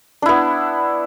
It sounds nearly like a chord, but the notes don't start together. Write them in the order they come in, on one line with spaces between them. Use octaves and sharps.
D4 E4 B3